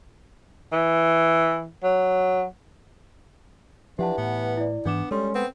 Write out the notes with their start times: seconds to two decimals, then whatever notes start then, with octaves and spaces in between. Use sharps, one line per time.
0.72 E3
1.83 F#3
3.99 E3 F3 D4 G4 F#5 A5
4.18 A2 B3
4.57 E4 D5
4.85 G#2 E3 B3 D4 D6 E7
5.11 G3 G#3 C#4 A4 C6
5.35 B3 C4